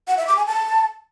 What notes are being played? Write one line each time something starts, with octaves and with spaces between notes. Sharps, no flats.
F#5
E5
D6
G#5
A5